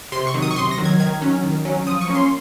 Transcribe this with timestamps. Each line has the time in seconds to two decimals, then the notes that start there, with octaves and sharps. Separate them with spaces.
0.12 C3 C6
0.27 C#6
0.34 D#3 F#3
0.42 D#6
0.51 C#6
0.56 C3 C6
0.71 A#6
0.78 D#3 F#3
0.85 G#6
1.00 D#3 G#6
1.21 F#3 C#4
1.43 D#3
1.65 F#3 C#4
1.87 F3 D#6
2.01 C#6
2.08 A#3 C#4
2.15 C6